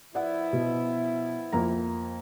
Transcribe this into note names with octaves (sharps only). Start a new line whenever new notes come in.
F3 B3 E4 D5 F#5
B2
F2 A#3 A#5